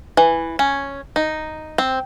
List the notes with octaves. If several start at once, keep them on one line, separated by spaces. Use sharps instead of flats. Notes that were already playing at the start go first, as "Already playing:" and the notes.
E3
C#4
D#4
C4